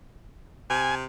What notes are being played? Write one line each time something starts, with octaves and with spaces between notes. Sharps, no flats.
C3 G#5